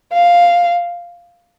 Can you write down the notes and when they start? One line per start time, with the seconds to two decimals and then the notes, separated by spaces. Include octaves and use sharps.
0.13 F5